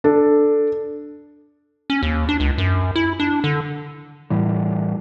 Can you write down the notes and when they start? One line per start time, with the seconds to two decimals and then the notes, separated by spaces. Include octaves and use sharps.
0.04 D4 A4
1.90 C#4
2.03 D#2
2.29 D4
2.40 C#2
2.58 F#2
2.96 E4
3.20 D4
3.44 D3
4.30 A2 E3 G3